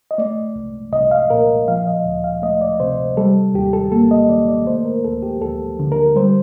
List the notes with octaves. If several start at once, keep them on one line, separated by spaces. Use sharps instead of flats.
D#5
A3 D5
C2
C2 D#5
F5
A#2 A#4
F3 F5
D#5
D2
F5
A3 D#5
D5
C3 C5
G3 A4
D#2 G4
A4
A#3 A4
D#5
D#3 D5
D5
A3 C5
A#4
D2 A4
G4
D2 A4
D3
A#4
G3 C5